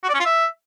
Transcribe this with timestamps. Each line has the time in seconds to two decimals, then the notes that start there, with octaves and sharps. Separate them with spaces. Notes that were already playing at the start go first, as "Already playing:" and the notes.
0.03 F#4
0.09 D5
0.14 C#4
0.20 F4
0.25 E5